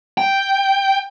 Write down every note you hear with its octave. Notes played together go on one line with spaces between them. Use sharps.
G5